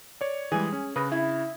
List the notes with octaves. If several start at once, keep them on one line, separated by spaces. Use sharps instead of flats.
C#5 D5
E3 G3 G#3 G#4
C#4
C#3 B4 D#6 A#6
E4